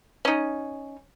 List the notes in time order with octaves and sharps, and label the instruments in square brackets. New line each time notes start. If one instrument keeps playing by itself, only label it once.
[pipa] C#4 D#4